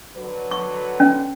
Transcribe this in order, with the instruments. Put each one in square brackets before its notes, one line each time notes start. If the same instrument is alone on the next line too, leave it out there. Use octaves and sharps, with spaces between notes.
[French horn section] D3 F#3 B4
[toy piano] C#6
C#4